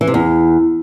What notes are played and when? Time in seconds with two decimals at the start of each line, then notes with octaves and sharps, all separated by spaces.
0.01 E3
0.07 C3
0.14 E2